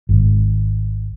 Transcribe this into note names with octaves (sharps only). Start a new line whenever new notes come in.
G#1